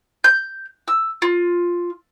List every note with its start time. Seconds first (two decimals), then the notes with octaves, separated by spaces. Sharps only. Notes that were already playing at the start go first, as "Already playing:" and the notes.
0.24 G6
0.88 E6
1.22 F4